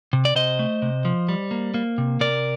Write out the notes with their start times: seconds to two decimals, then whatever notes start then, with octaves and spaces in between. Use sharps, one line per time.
0.13 C3
0.25 D5
0.35 C3 C5 D#5
0.59 A3
0.82 C3
1.05 F3
1.29 G3
1.51 A#3
1.74 A#3
1.98 C3
2.20 C3 A#4 D5